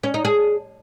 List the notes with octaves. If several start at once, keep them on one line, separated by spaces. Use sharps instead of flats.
C#4
D#4
G#4